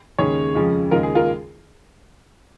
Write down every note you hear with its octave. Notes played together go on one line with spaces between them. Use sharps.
D#2 C#3 G#3 C#4 G#4 C#5
F2 C#3 F3 G#3 C#4
D#2 C#3 G#3 F4 A#4
G#4
F4 A#4